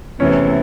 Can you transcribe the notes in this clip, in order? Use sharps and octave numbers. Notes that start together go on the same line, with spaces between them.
E2 C3 E3 A3 C#4